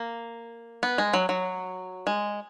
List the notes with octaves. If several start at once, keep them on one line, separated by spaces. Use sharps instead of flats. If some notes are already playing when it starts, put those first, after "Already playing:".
Already playing: A#3
B3
G#3
F#3
F#3
G#3